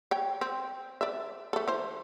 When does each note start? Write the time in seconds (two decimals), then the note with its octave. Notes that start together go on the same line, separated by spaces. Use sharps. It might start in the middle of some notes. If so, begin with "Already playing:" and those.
0.11 C#5 G5
0.41 C4
1.01 D5 E5
1.53 A3 A4
1.68 E3 C5